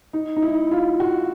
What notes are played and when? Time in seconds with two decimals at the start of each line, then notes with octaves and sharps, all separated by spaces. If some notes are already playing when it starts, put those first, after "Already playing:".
0.13 D#4
0.37 D#4
0.42 E4
0.71 F4
1.00 F#4